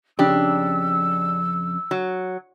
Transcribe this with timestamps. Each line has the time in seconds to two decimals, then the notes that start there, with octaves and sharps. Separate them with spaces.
0.19 F2 C#3 D4 G4 E6
1.91 F#3